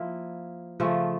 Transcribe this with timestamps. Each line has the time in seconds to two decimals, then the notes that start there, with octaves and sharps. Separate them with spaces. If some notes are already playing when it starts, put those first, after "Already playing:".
Already playing: F3 A#3 E4
0.80 C#3 F3 A3